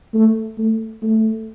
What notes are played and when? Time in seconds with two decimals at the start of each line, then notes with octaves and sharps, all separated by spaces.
0.14 A3
0.58 A3
1.02 A3